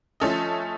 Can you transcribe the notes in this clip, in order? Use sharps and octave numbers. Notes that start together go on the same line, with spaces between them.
F3 A3 C#4 A4 D#5